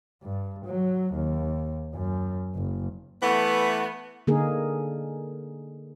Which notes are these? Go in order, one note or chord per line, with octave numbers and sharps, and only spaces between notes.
G2
F#3
D#2
F#2
F#1
E3 A3 B3
D3 A#3 D#4 G#4 A#4